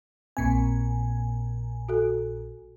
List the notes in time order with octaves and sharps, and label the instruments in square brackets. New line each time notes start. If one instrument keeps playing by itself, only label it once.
[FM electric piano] A#1 A#2 G#5 [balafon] C4
[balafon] F#4 A4